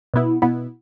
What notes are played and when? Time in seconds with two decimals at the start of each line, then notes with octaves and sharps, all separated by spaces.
0.14 B2 B3 E4
0.42 B2 B3 E4